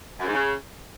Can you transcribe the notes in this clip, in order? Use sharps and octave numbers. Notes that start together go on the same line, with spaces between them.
F#2
G#2
C#3